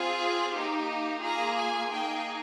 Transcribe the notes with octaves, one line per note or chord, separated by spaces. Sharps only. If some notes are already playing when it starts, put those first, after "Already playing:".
Already playing: C4 F4 G#4
A#3 D#4 G4
A#3 F4 G#4 A#5
G#5
A#3 D#4 G#4 G5